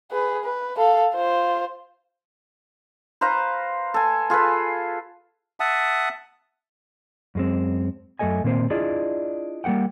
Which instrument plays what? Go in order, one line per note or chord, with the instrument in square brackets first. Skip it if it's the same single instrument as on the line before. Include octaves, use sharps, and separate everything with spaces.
[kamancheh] G#4 B4
B4
A4 F5
F4 C5
[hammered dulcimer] B4 C5 F5 A#5
A4 G#5
F4 G#4 A4 B4
[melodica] E5 F#5 A5 D#6
[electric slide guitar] F#2 G#3 C4
F#2 A3 A4 D#5 G#5
A#2 D#3 A#3 C4 C5
D4 E4 F4 G#4 D5 D#5
G3 A#3 G4 F#5 G5